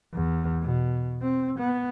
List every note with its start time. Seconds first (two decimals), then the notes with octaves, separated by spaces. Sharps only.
0.13 E2
0.62 B2
1.22 C4
1.59 B3